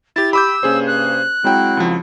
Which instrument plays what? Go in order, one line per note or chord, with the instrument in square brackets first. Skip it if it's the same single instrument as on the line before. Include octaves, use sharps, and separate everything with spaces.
[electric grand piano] E4 G4 [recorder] A6
[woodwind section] G4 [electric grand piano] B5 D6 G6 [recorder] E6
[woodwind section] G2 C3 A#3 [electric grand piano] C#4 G#4 C5
[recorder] F#6
[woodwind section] F#3 C4 E4 [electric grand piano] G#3 G5
[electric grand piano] C#2 F3